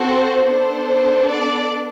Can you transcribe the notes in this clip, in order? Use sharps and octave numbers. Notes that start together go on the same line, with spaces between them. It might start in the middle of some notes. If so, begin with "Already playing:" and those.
Already playing: C4 F#4 A4 C5
B3 D4 A4 C5
D5